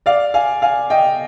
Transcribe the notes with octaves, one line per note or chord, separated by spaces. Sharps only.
D5 F5
F5 G#5
F5 G#5
D#5 G5